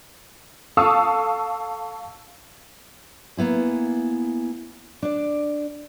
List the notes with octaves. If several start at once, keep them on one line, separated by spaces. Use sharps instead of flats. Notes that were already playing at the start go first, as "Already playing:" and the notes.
A4 F5 A5 C#6 D#6 E6
A#3 B3 E4 G#4
D4 D5